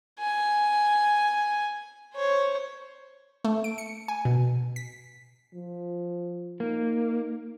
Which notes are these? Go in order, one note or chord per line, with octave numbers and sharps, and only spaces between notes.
G#5
C5 C#5
A3
D7
C#7
G#5
B2
B6
F3
A#3 D#4